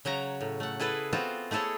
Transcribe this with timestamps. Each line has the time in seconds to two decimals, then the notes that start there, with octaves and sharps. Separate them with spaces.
0.05 C#3 F#3 C#5 A#5
0.41 A2
0.60 A3 F#5
0.80 E4 G#4 A4 B4
1.13 B3 C4 F4 F#4 C5
1.51 A3 E4 G#4 A4 C#5